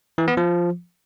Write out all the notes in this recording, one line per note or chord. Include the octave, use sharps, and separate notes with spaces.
E3
B3
F3